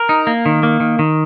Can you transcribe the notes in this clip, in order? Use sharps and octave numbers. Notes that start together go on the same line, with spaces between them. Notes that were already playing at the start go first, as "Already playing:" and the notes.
Already playing: A#4
D#4
A#3
D#3
A#3
D#3
D#3